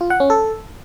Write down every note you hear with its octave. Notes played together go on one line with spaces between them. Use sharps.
F4
F#5
C#4
A4